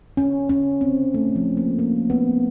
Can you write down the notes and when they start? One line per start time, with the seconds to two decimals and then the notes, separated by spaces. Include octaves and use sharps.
0.17 C#4
0.49 C#4
0.81 C4
1.14 A3
1.36 F3
1.57 A#3
1.79 A#3
2.10 B3